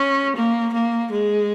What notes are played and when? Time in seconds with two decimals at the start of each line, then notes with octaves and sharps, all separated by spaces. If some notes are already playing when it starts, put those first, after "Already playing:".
Already playing: C#4
0.36 A#3
0.73 A#3
1.11 G#3